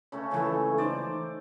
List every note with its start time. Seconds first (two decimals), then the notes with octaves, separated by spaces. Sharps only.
0.12 C#3 A3 C#4
0.31 C#2 E3 A4
0.78 D#4 C5 D5